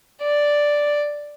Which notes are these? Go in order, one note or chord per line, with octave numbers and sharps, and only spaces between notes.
D5